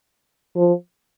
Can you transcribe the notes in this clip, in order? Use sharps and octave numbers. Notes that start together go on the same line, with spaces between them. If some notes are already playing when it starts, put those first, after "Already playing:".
F3